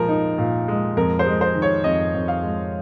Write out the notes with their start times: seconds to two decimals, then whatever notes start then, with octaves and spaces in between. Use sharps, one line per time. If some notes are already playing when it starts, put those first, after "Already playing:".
Already playing: A#2 F3 G#3 A#4
0.09 D#4
0.38 A#2
0.68 G#3
0.97 F2 A#4
1.19 C5
1.26 G#3
1.41 C5
1.55 D#3
1.62 C#5
1.84 F2 D#5
2.14 F2
2.28 F5
2.43 G#3